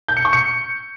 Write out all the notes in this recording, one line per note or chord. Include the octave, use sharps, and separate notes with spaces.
G6
C#7
C#6
C#7